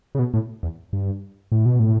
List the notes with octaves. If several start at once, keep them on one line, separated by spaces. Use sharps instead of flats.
C#3
B2
A2
E2
G2
A2
B2
A2